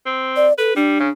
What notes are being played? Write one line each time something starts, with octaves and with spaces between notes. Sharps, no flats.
C4
D5
A4 B4
G3 D4
C#3